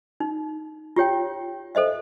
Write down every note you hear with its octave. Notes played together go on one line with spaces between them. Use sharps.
D#4
F4 G4 C#5 G5
A4 C5 D#5 E5